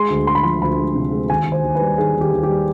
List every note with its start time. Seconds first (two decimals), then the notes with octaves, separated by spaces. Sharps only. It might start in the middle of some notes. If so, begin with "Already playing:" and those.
Already playing: G#3 C6
0.10 D2
0.27 G#3 C6
0.35 B5
0.43 F3 C6
0.61 D2 B5
0.78 G#3
0.95 C3
1.12 G#3
1.29 D#2 G#5
1.47 D#2
1.52 C5
1.64 D#2
1.75 B4
1.81 G3
1.98 D#3 G#4
2.15 D#2
2.21 G4
2.33 D#2
2.43 G4
2.49 G3